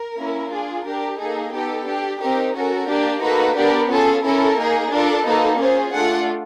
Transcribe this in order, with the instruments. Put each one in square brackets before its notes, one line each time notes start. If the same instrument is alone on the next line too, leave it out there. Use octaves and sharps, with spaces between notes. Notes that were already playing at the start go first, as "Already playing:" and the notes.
Already playing: [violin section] A#4
A#3 C#4 E4
D4 F4 G#4
D4 G4 A#4
A#3 D#4 G#4 A4
B3 D#4 G4 A4
D4 G4
C4 D#4 G4 A#4
C#4 F#4 A4 A#4
A#3 D4 G4
A#3 D#4 F#4 A4 B4
B3 D4 G4 A#4
C#4 F4 G#4 A4
C#4 E4 A4 A#4
A#3 D#4 G#4
D4 F4 A4 A#4
A#3 D#4 F#4 A4 B4
C#4 F4 G#4 C5
A3 D4 F4 F#5